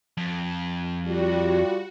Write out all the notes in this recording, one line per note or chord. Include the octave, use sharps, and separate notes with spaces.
F2
G3 F4 F#4